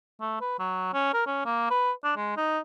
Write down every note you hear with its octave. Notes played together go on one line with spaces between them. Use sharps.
A3
B4
F#3
C#4
A#4
C#4
A#3
B4
D4
G#3
D#4